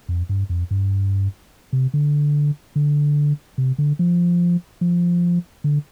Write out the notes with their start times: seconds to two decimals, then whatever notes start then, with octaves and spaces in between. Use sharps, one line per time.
0.09 F2
0.29 G2
0.49 F2
0.71 G2
1.73 C3
1.94 D3
2.76 D3
3.58 C3
3.78 D3
3.99 F3
4.81 F3
5.64 D3